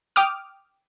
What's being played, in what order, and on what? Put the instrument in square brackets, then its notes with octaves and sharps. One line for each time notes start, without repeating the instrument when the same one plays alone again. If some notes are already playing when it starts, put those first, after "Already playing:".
[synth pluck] G5 D6 D#6 F6